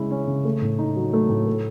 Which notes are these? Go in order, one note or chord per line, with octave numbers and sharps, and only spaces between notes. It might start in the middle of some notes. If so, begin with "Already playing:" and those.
Already playing: C#3 G#3 C#4 E4
C#4
C#3
A3
A2
D#4
F#3
A3
A2
A4